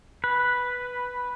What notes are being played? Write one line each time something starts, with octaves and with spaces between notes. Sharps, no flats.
B4